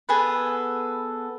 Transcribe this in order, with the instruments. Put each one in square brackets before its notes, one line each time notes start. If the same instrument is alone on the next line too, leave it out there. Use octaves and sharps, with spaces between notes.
[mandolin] B3 G#4 A4 B4